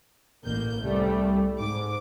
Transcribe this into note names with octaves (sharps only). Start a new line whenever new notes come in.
A1 A#3 G6
C2 G3 A3
G#2 D6